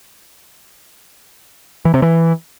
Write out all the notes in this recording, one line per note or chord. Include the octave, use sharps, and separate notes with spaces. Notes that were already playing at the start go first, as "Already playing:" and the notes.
E3
C3
E3